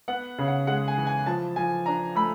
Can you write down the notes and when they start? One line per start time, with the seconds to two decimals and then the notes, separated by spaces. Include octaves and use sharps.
0.08 B3 F#5
0.38 C#3
0.48 F#5
0.67 G#3 F#5
0.88 G#5
0.98 E3
1.07 G#5
1.26 F3 A5
1.56 F3 G#5
1.86 D4 A#5
2.15 A3 B5